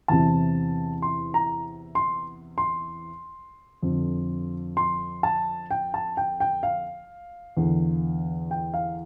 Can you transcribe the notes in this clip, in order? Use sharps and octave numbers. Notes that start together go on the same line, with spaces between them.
E2 C3 E3 A5
C6
A#5
C6
C6
F2
D3
C6
A5
G5
A5
G5
G5
F5
E2 D3
G5
F5